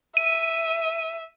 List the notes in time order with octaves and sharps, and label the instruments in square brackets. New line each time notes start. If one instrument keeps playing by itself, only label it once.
[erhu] E5 [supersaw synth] D#7